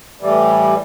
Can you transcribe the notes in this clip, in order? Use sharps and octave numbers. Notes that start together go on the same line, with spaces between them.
A2 E3 G3